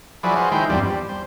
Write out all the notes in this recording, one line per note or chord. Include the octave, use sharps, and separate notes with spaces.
F3 F#3 E4 G#4 B4 D5
F4 F#4 G#4 C5
D#3 G#3 E4 G5 C6
E2 G2 F3 G3 C4
G3
C5